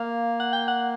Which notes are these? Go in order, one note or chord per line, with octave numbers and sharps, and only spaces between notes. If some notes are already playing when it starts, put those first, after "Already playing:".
Already playing: A#3 F5
F#5
G5
F#5